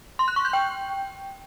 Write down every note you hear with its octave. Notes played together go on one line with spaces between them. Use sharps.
C6
F#6
C#6
G6
G5